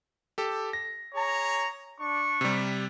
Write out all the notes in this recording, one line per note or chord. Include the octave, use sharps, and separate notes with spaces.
G4 A4
A#6
G#4 C#5 A#5
D4 C#6
C3 G3